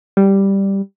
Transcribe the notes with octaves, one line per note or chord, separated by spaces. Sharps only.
G3